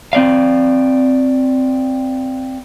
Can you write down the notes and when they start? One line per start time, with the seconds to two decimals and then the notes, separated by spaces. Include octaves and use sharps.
0.13 C4 D5 F5